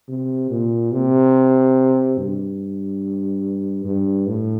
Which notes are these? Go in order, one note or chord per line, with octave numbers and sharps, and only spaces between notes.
C3
A#2
C3
G2
G2
A2